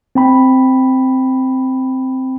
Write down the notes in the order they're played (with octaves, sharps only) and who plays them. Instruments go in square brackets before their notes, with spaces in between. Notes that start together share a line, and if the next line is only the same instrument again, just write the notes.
[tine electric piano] C4 G5 B5